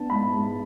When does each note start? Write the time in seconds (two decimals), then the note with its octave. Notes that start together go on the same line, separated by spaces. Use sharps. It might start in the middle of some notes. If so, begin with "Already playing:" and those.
Already playing: B3 D4 A5
0.10 G#2 B5
0.33 G#3